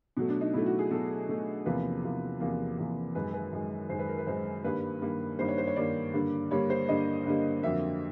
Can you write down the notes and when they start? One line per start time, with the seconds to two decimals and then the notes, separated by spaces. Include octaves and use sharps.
0.17 B2 F#3 A3
0.29 D4
0.41 D#4
0.53 B2 F#3 A3 E4
0.66 F#4
0.79 G#4
0.91 B2 F#3 A3 A4
1.28 B2 F#3 A3
1.66 E2 C3 F3 A#3 B4
2.03 E2 C3 F3 A#3
2.40 E2 C3 F3 A#3
2.78 E2 C3 F3 A#3
3.15 F#2 D#3 G#3 B4
3.34 B4
3.53 F#2 D#3 G#3
3.89 F#2 D#3 G#3 C5
3.99 B4
4.08 A#4
4.18 B4
4.27 F#2 D#3 G#3 C5
4.64 G2 D#3 G3 A#3 B4
5.02 G2 D#3 G3 A#3
5.39 G2 D#3 G3 A#3 C5
5.48 C#5
5.58 C5
5.67 C#5
5.76 G2 D#3 G3 A#3 D5
6.13 G2 D3 G3 A#3
6.51 G2 D3 G3 A#3 C#5
6.70 C5
6.88 G2 D3 G3 A#3 D#5
7.25 G2 D3 G3 A#3
7.63 F2 D3 F#3 A#3 E5